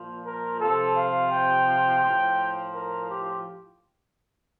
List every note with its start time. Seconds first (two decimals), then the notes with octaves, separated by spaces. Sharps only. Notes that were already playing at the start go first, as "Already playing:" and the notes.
Already playing: A#2 F3
0.25 A#4
0.60 C3 F3 A4
0.96 F5
1.31 G5
2.03 A2 F3
2.75 A#4
3.10 G4